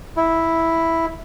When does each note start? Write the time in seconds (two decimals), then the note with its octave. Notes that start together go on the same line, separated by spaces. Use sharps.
0.17 E4